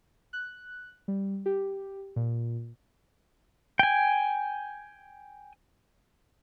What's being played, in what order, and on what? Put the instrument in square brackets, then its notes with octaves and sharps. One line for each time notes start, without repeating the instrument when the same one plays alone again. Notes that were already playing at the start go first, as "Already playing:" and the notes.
[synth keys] F#6
G3
G4
A#2
[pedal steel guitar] G5 G#5